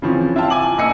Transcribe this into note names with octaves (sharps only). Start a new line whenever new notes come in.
C#3 E3 F3 C4 C#4
E4 F4 F5 G5 A5
G#5 D6 F#7
A#1 A#3 D#5 G#5 E6 C#7